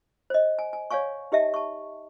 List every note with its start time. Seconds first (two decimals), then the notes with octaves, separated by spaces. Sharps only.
0.30 C5 D#5
0.59 G#5
0.73 G#5
0.91 C#5 D5 F5 G#5 C#6
1.32 D#4 G4 D#5 E5 A5
1.54 A5 C#6